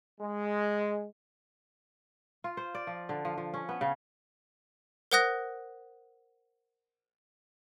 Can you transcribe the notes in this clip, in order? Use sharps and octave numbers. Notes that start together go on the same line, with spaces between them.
G#3
F4
C5
D5
F3
D3
F3
F3
C#4
B3
C#3
A#4 C5 F#5 D#6 F#6 A#6